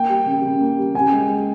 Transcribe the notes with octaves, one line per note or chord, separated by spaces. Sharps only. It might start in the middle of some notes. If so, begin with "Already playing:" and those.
Already playing: A#3 G5
G3
C#3
C#3
A#3
G3
C#3 G#5
G#3
G#3